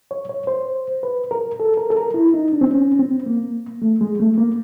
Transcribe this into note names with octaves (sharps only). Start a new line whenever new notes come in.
C#5
C#5
C5
B4
A#4
A4
A#4
A4
A#4
E4
D#4
D4
C4
C#4
C4
A#3
A3
G#3
A3
A#3